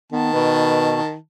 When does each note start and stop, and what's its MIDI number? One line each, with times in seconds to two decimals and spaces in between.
0.12 1.14 51
0.12 0.33 59
0.12 1.14 81
0.33 1.00 47
0.33 0.95 71